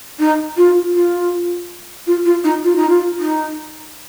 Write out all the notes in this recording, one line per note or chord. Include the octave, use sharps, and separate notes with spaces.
D#4
F4
F4
F4
F4
D#4
F4
D#4
F4
D#4